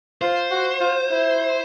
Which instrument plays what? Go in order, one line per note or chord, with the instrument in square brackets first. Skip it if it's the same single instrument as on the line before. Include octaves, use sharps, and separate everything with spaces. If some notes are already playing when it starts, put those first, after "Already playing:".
[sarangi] F4 [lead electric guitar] C5
[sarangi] F#4
F4
E4